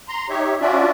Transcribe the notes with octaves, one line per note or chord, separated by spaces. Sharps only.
A#5 C6
D#4 G4 C#5 E5
C#4 D4 F4 F#4 D5 E5